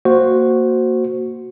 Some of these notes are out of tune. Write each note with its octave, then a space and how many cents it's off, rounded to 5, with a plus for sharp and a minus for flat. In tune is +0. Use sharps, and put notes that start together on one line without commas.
A#3 -10 F#4 +0 C5 +0